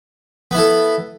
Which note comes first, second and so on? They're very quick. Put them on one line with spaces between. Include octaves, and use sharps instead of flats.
B3 E4 A4